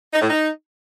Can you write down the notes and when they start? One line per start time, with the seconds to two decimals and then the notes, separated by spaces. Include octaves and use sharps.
0.14 D#4
0.21 A2
0.29 D#4